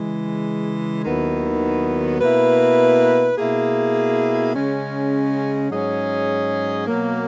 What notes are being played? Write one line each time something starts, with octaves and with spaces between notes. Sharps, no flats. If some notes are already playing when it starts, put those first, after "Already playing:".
Already playing: C#3 E3 G#3
D#2 D#3 F#3 B3 E4
B2 A#3 E4 B4
B2 A#3 E4 G#4
C#3 G#3 C#4
G#2 F#3 C#4 G#4 D#5
B2 F#3 A#3